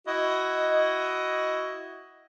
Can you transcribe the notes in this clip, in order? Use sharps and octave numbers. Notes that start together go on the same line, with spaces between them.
E4 F#4 D#5